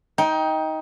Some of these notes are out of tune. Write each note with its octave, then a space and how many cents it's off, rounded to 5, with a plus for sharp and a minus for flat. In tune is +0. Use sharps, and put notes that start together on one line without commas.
D#4 +20 G5 +0